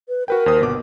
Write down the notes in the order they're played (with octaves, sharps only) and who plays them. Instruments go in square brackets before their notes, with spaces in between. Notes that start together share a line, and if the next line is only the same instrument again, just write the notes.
[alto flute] B4
[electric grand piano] F#4 B4 G5 [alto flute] A#4
[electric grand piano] D#2 C5 D#6
G1 B2 D6